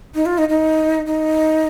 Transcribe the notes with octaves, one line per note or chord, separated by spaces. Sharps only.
D#4
F4
D#4
D#4
D#4